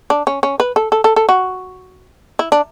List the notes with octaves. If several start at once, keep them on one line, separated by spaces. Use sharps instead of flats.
D4
C#4
C#4
B4
A4
A4
A4
A4
F#4
E4
D4